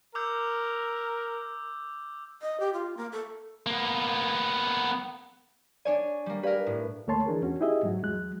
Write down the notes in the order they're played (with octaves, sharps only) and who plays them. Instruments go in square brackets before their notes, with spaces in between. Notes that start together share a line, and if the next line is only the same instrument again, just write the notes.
[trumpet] A#4 [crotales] D6 E6 G6
[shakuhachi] D#5
G4
F4
A#3
A4
[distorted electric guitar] A#3 B3
[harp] D4 C#5 G#5 [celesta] D5
[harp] G3 A#3
[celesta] G4 D5 F5 [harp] A#4 B4
[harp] A2
[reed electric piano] D2 A3 A#3 C#5 A5 C6
E3 D4 G#4 A#4
E2 C#4 F#4
D#4 E4 G4 G#4 D#5 E5
G#2 F#3 F#4
E2 F#3 G#3 F#6